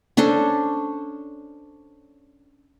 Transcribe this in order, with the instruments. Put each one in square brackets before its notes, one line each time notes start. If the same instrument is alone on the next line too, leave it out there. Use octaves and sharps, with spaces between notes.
[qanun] C#4 D4 A4 C5